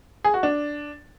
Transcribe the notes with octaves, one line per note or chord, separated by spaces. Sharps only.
G#4
F#4
D4